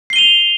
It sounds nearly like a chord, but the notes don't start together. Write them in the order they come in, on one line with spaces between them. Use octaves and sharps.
C7 G7 D#7 F7